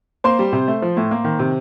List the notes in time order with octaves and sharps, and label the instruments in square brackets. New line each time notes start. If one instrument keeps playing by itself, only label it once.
[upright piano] A#3 C5 C6
G3
C3
A3
F3
A2
A#3
D#3
C3